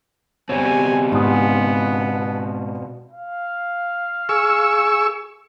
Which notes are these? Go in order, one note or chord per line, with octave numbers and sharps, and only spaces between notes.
B2 G3 C4 G#4 C#5 G#5
G#2 B3 D4 F4 F5 G#5 D#6
F5
G#4 C#6 E6